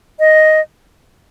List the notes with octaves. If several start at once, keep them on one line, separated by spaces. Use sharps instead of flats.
D#5